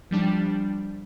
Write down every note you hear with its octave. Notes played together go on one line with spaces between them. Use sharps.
F3 G3 D4